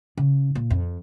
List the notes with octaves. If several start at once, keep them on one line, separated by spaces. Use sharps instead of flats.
C#3
A#2
F2